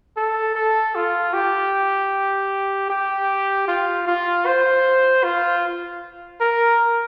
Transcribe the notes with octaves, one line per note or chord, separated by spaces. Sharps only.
A4
A4
F4
G4
G4
F4
F4
C5
F4
A#4